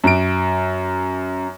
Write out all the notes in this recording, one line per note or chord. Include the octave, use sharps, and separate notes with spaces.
F#2 D7